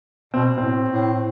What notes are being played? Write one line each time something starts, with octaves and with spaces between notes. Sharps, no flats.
B2 C4
A2 C4
A2